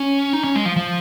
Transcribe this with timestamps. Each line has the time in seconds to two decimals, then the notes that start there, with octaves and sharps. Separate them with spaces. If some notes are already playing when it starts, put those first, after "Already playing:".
Already playing: C#4
0.33 D#4
0.44 C#4
0.55 G#3
0.65 F3
0.76 F3